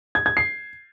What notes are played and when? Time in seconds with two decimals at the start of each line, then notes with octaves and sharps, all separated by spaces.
0.15 G#6
0.26 G#6
0.37 C7